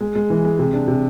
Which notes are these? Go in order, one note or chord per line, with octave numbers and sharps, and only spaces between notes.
G#3
G#3
E3
G#3
C3
D4
C3